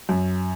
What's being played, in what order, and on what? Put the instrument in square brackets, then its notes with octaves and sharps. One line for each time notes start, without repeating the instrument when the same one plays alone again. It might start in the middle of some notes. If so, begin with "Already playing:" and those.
[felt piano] F#2